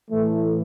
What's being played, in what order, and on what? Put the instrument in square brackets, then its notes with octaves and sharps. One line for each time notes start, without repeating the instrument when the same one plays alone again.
[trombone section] A2 E3 A3